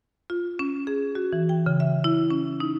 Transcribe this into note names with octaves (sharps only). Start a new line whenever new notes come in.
F4
C#4
G#4
F#4
E3
G5
C#3
E5
E4
C#4
D#4